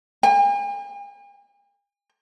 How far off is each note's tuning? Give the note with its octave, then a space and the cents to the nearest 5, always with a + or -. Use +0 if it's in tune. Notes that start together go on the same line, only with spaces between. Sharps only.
G#5 -45